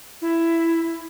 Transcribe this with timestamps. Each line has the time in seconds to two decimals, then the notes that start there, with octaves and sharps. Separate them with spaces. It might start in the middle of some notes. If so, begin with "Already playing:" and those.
0.22 E4